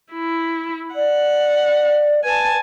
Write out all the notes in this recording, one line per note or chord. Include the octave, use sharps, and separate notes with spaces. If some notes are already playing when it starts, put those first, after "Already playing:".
E4
D5 F#5
B4 G#5 A5